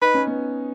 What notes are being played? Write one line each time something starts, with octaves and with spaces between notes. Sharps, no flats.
D#4 B4
C#4
B3